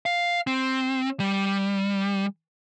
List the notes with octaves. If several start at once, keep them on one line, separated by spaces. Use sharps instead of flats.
F5
C4
G3